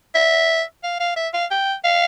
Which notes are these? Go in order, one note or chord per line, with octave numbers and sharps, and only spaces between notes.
E5
F5
F5
E5
F5
G5
F5